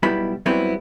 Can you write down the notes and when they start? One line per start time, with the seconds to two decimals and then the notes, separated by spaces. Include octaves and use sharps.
0.03 B1 B2 G3 B3 E4 B5
0.46 F#2 F#3 G3 B3 C4 E4